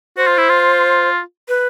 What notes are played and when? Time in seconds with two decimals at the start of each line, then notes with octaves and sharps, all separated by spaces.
0.17 F#4 C5
0.27 F4
0.38 E4
0.49 F4
1.48 B4